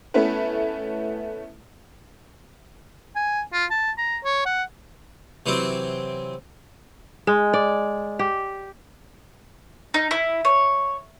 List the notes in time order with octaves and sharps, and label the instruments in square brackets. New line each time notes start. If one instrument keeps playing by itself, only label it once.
[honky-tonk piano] A3 B3 C#4 E4 B4
[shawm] G#5
F4
A5
A#5
C#5
F#5
[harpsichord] C3 E3 F#3 C4
[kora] G#3
D5
G4
[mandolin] D#4
E4
C#5